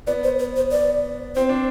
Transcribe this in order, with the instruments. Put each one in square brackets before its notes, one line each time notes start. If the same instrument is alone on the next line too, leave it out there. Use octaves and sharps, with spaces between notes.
[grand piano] B3 [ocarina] D5
[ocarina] C5
B4
C5
D5
[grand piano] C4 [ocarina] C5
[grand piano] D4